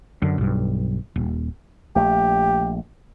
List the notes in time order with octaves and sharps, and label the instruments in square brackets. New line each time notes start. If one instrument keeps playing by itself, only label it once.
[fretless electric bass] F#2 D3
B1 G2
D#1
[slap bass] A#1 A3 [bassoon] G4